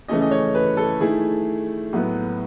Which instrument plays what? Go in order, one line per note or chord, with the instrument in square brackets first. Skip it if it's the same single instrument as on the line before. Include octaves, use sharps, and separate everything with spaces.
[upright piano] C#3 E3 A3 C#4 D#5
D#5
C#5
B4
A4
D#3 A3 E4 G#4
A2 F#3 B3